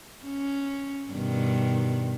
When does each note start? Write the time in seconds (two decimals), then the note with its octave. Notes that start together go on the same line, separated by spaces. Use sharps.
0.25 C#4
1.11 G2 B2 D#3